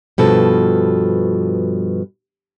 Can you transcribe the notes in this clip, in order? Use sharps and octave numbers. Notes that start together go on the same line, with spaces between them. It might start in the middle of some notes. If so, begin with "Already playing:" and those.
G2 B2 F3 A4